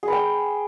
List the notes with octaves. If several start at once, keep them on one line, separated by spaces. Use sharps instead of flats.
G#4 B4 G5